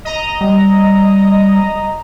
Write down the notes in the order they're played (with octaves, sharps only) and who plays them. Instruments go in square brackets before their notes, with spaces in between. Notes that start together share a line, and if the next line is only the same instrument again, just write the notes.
[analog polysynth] D#5 A#5
[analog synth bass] G3